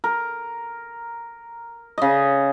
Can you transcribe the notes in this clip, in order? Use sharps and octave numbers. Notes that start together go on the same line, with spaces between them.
A#4
C#3 D#5